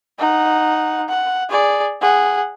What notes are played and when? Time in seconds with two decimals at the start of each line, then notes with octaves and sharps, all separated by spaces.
0.19 D#4 F#5
1.09 F#5
1.50 G#4 D5
2.01 G#4 F#5